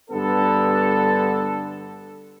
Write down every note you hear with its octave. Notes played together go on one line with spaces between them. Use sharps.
G2 D3 B3 A4